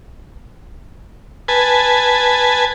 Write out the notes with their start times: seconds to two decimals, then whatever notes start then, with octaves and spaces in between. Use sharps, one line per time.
1.48 B4 G#5 A5